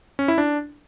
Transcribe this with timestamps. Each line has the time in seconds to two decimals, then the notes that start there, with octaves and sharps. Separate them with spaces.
0.19 C#4
0.28 E4
0.38 D4